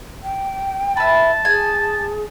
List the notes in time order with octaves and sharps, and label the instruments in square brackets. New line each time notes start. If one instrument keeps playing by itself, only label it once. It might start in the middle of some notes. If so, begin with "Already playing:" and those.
[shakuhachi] G5
[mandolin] E4 B4 [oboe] A5
[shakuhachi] G#4 [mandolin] G#5